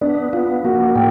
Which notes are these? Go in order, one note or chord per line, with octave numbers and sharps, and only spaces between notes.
B3 D4 D5
B3 F4 F5
A#3 F#4 F#5
A2 G5